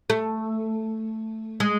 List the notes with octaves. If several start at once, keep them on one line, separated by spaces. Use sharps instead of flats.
A3
G#3